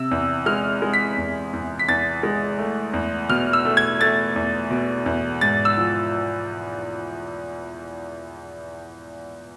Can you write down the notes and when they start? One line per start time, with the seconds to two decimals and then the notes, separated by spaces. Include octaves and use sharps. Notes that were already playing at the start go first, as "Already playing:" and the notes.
Already playing: C3 E6
0.11 E2
0.46 G#3 F6
0.82 G#3
0.94 B6
1.18 E2
1.53 E2
1.79 B6
1.88 E2 A6
2.23 G#3
2.59 A3
2.93 E2
3.29 B2 F6
3.53 E6
3.65 A3
3.77 G#6
4.00 A3 A6
4.36 E2
4.70 B2
5.06 E2
5.41 G#2 A6
5.65 E6
5.77 F3